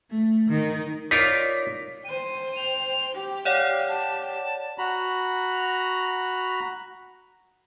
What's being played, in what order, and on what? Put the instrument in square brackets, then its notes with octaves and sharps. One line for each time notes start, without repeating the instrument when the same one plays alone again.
[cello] A3
D#3
[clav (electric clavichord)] D#4 F4 A#4 [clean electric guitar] C#5 D5 [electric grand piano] B6
[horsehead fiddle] C5 G5 [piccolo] D#7
[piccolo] F7
[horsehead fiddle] G4
[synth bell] C#5 D5 F#5 [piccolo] F5
[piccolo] A5
[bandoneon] F#4 A#5 B5